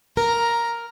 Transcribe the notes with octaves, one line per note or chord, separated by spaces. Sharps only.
A#4 A#5